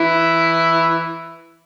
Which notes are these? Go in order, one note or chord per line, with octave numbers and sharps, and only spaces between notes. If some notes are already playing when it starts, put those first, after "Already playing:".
Already playing: E3 E4